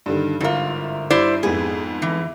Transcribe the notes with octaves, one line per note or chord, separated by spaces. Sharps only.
G2 D3 D#3
G1 G#2 E4 F4 A#4
G2 E4 C5 D5
F2 G#2 B3 G#4
E3